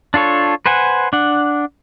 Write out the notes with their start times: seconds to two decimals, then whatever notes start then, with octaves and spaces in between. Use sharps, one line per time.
0.14 D4 F4 A4 C#5
0.66 B4 C5 F#5 G#5
1.13 D4 F#5